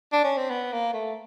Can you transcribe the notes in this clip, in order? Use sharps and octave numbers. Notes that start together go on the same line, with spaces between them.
D4
C#4
C4
B3
A#3
A3